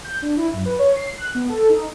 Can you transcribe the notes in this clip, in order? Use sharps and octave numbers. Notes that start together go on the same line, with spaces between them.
G6
D4
E4
F#2
B4
C#5
C7
F#6
B3
A4
D#4